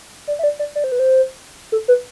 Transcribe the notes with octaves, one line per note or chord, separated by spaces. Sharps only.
D5
E5
D5
D5
D5
C5
B4
C5
A4
B4